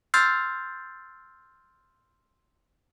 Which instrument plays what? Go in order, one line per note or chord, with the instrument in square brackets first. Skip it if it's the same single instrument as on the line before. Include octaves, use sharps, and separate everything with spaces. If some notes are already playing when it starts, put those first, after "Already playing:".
[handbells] C6 E6 F6 G6 A6 C7